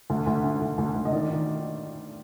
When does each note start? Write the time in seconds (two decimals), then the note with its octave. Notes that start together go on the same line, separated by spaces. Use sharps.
0.10 D2
0.27 D2
0.44 D3
0.61 D2
0.78 D2
0.96 D2
1.05 D#5
1.13 D#3 D5
1.30 D#3